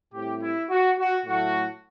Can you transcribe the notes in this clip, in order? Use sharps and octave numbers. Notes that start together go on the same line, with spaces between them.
A2 G3 C4 G4
E4
F#4
F#4
A2 F#3 A3 F#4